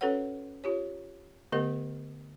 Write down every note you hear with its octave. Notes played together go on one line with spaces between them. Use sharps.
C#4 F#4 A4 B4 C#5 F#5
F4 G4 C#5
D3 A3 B3 G4 A#4 D#5